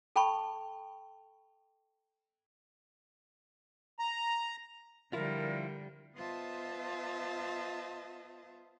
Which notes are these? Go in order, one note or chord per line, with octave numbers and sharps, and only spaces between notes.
A4 G5 A5 B5 C#6
A#5
D3 F3 G3 E4 F4 A#4
B3 F4 C5 D#5 E5 A5